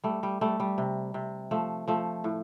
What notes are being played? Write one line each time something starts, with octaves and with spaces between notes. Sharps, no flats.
G3 A3
G3
G3 A3
G3
C3
C3
F3 A3
F3 A3
A2